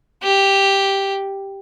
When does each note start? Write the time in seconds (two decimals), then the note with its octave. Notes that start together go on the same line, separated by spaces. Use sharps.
0.23 G4